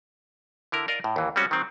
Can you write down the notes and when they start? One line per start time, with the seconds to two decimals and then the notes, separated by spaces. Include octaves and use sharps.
0.72 D3 E4 A#4
0.88 A#4 D5 D#5 F5
1.04 A2
1.16 D#2 E3
1.36 G3 G#3 C4 C#4 F#4
1.51 D#3 F#3 C4